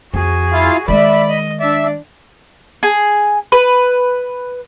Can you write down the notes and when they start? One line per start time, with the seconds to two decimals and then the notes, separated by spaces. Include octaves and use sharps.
0.14 F2 F#4 G#4
0.52 E4 F4 F5
0.88 D#3 G#3 D5 E5 B5
1.29 D#5
1.60 D4 D5 E5
2.83 G#4
3.52 B4